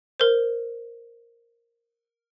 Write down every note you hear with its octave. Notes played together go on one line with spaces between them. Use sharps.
A#4 C5